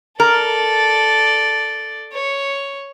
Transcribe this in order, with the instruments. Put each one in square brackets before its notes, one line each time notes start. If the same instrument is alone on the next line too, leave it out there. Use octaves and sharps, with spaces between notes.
[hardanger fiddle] A4 D5 [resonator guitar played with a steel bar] A#4
[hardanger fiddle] C#5